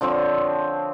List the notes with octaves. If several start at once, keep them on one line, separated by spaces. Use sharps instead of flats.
D3 F3 C4 C#5